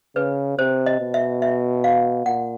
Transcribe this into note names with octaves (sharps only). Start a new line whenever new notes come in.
C#3 B4
C3 C5
D#5
B2
E5
E5
F5
A#2 F#5